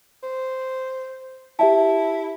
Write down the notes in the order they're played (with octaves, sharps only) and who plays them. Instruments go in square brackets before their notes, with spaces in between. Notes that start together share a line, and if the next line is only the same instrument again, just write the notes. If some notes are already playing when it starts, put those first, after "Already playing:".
[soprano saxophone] C5
[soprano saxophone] E4 [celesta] G4 E5 A5